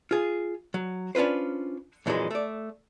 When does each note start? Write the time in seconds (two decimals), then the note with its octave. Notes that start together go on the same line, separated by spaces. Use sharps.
0.11 F4 G#4
0.74 F#3
1.15 C#4 D4 F4 B4 C5
2.06 F2 A#2 E3 F#3 G#3
2.31 A3 D5